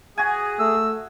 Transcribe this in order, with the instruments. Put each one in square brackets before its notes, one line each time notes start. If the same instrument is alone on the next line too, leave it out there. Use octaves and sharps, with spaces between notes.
[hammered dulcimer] F#4 G#5 [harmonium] G#4
[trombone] A3 [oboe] E6